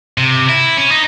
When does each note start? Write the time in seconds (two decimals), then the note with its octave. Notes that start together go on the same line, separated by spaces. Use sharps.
0.18 C3
0.49 E4
0.77 C#4
0.91 D#4